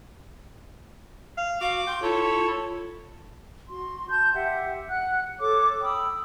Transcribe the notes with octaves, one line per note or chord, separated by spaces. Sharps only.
F5
F#4 F5 D6
G5 C6
E4 F4 A4 C#5
F#4 C6
A5 C6 G6
G4 E5 F#5 G5
F#5 F#6
A4 C#5 D6
G5 B5 D#6 E6